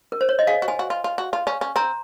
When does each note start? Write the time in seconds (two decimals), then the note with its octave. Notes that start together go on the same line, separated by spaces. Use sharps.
0.12 A#4
0.21 C5
0.29 C#5
0.39 D#5
0.47 G#4 F5
0.62 F#4
0.68 F4 G#5
0.79 F#4
0.90 F4
1.04 F4
1.18 F#4
1.33 F4
1.47 C#4
1.61 C#4
1.76 C4 A#5